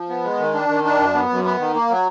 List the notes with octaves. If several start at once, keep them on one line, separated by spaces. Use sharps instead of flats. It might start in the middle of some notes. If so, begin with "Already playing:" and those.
Already playing: F3
B3
G#3
D#3
D4
D#3
D4
F#2
B3
F#2
B3
D#3
A#3
F#3